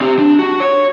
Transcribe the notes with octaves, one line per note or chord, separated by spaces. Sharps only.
C4 G4
D4
F#4
C#5